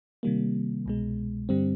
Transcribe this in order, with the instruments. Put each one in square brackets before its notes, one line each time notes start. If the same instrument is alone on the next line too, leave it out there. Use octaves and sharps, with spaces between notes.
[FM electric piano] C3 D#3 G3 A#3
C2 B2 G#3
G2 D3 G3 C4